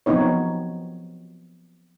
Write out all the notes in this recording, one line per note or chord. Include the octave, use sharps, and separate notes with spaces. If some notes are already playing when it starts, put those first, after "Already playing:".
F3 F#3 B3 C4 D#4 C#5